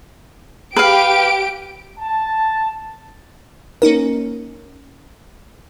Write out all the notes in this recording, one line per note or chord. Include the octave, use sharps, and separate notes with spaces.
G4 B4 F5 D7
A5
A#3 C#4 D#4 A#4